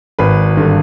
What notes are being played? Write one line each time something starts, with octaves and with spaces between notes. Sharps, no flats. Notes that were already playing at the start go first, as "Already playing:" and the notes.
G#1 B4
G2 D3